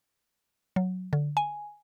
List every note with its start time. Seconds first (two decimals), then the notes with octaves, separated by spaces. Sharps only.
0.76 F#3
1.13 D3
1.37 G#5